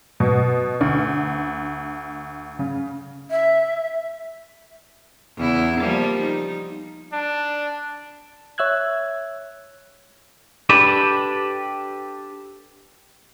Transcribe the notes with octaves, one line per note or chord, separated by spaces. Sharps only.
B2
D2
C#3
E5
E2 C#3 E4
F3 G3 A#3
D#4
D4
C#5 E5 E6 F#6 G#6
D4 G4 A4 B4